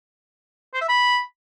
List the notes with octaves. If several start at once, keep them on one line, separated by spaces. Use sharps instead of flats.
C5
E5
B5